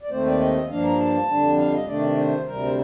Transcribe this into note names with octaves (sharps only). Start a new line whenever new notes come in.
D5
D#2 D#3 A3 C4 C5
D5
D#5
G2 F3 A#3 D4 F5
A#5
A5
F2 D3 G3 D4
F5
D#5
C3 D#3 A3 D4 D5
C5
D2 C3 G3 A#4
C5